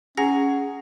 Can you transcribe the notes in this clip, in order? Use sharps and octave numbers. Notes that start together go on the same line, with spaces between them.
C#4 G#4 F#5 A#5 A#6